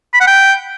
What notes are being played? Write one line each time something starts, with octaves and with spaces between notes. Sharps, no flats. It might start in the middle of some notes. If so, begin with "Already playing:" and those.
B5
F#5
G5